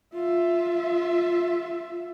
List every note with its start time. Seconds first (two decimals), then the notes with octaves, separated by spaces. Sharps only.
0.14 F4 E5